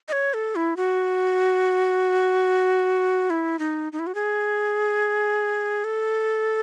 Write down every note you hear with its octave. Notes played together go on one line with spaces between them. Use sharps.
D#5
C#5
A4
E4
F#4
E4
D#4
D#4
E4
F#4
G#4
A4